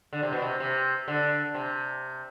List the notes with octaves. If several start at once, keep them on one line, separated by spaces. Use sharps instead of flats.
D3
C3
B2
C3
C3
D3
C3